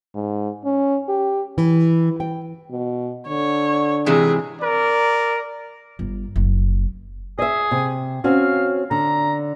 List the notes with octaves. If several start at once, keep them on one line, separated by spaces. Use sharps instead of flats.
G#2
C#4
G4
E3
G5
B2
D3 C#5
G#2 C3 E3 G#4
A#4 D5
G1
F#1
G#4 D#5 E5
C3
C4 C#4 F#4 F5
D3 A#5